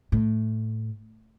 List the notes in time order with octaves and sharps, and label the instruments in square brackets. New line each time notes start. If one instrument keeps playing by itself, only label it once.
[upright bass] A2